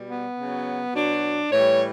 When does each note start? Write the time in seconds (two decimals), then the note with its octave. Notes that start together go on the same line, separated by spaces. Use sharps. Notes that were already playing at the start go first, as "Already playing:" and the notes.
Already playing: B2 G3
0.09 B3
0.38 C#3 F#3
0.95 B2 F#3 D4
1.52 A2 E3 G3 C#5